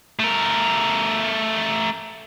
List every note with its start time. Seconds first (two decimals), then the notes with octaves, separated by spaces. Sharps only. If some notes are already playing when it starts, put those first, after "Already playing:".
0.19 A3 A#4